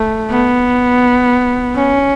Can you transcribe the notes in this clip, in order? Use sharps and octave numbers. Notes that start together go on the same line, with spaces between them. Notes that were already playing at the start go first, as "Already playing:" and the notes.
Already playing: A3
B3
C#4